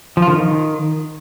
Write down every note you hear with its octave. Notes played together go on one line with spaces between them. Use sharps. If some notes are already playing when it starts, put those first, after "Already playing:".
F3
F4
D3
D#3